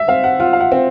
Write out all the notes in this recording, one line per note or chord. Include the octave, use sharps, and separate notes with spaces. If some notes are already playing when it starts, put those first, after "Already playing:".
Already playing: E5
C4 F5
F#5
F4 F#5
F5
F#5
C4